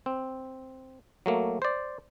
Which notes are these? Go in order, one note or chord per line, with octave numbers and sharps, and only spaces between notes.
C4
F#3 A3 A#3
C5 D5